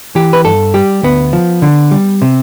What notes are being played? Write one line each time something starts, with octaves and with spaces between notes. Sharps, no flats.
E3 G4
B4
G2 A4
G3 G4
D2 B3
F3
D3
G3
C3